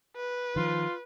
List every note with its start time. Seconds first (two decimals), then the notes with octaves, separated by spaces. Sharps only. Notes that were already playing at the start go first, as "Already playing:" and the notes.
0.16 B4
0.56 D#3 F3 F4